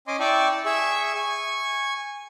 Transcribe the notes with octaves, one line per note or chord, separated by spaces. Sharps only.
C#4 D#5 G#5 C6 D6
E4 D5 G5 A5 C#6
G#4 E5 C#6 E6
G#5 C#6